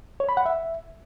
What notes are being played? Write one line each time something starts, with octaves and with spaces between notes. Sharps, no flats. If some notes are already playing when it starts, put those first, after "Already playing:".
C#5
B5
F#5
E5